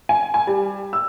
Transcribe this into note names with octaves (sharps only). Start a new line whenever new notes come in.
G#5
G#5
G3
E6